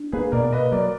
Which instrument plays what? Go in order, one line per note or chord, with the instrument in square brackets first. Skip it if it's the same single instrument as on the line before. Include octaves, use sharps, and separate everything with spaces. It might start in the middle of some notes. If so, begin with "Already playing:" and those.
Already playing: [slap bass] D4
[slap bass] A#3 [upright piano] G#4 B4
[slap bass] B2 [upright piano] A#4 D5
[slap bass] A#3 [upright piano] B4 D#5
[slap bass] F#3 [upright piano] A#4 D5